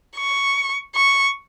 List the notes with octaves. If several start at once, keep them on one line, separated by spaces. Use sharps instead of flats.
C#6
C#6